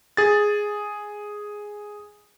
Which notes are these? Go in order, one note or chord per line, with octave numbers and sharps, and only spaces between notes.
G#4 A6